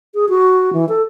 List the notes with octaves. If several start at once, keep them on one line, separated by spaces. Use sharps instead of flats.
G#4
F#4
E3
A4